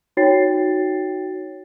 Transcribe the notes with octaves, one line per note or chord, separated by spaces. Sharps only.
D#4 F#4 C#5 G5 A6 C7